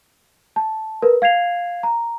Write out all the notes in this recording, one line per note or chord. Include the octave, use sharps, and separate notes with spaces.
A5
A#4 B4
F5 G#6 C7 F7
A#5